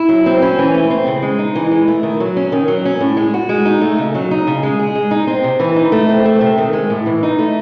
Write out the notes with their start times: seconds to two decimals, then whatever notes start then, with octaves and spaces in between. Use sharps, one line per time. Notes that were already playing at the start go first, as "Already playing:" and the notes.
Already playing: E4
0.09 F#3
0.26 C4
0.42 C#4
0.58 E3
0.74 A3
0.90 C4
1.07 C#3
1.22 G#3
1.39 D#4
1.55 E3
1.71 G#3
1.88 A3
2.03 D#3
2.20 F#3
2.37 C#4
2.52 D#3
2.68 F#3
2.85 C#4
3.01 A2
3.17 G#3
3.34 F#4
3.49 G#3
3.65 D#4
3.81 A3
3.98 C#3
4.15 F#3
4.31 D#4
4.47 C#3
4.63 G#3
4.79 G#4
4.95 G#3
5.11 D#4
5.27 C4
5.44 C3
5.60 E3
5.76 D#4
5.92 A3
6.09 C4
6.26 A3
6.41 C3
6.58 D#3
6.73 G#3
6.90 A2
7.06 E3
7.23 D#4
7.39 A3